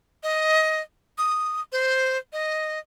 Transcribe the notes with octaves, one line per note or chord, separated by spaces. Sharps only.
D#5
D#6
C5
D#5